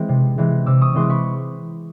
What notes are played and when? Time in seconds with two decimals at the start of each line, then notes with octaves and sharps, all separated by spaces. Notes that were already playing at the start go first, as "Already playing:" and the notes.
Already playing: E3 G#3 C4
0.09 C3
0.38 E3 G#3 C4
0.66 C3 D6 E6
0.82 C#6 D#6
0.94 E3 G#3 C4 C6 D6
1.10 B5 C#6